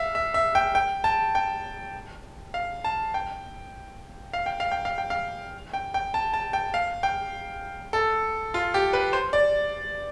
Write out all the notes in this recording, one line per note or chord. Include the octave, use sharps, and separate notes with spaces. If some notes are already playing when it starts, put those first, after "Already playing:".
Already playing: E5 F5
E5
E5
G5
G5
A5
G5
F5
A5
G5
F5
G5
F5
G5
F5
G5
F5
G5
G5
A5
A5
G5
F5
G5
A4
F4
G4
B4
C5
D5